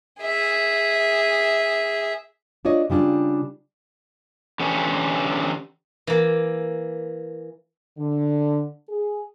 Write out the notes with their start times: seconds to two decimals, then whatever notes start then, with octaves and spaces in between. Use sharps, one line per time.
0.22 G#4 E5
2.65 D4 F4 C#5 D#5
2.90 C#3 G3 D4 F4
4.60 D3 E3 C#4 G4 C#5
6.07 E3 A#3
7.98 D3
8.89 G#4